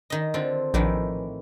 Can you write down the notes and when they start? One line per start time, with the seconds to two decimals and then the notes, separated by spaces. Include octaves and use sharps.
0.10 D#3 D#5
0.34 D3 C4 F4
0.74 A#1 A2 D#3 E3